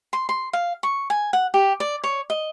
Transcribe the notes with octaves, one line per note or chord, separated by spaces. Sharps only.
C6
C6
F5
C#6
G#5
F#5
G4
D5
C#5
D#5